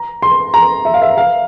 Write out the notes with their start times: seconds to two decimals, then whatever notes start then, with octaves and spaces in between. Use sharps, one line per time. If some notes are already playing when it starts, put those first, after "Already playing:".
Already playing: A#5
0.22 C6
0.54 A#5
0.85 E5
0.94 F5
1.02 E5
1.18 F5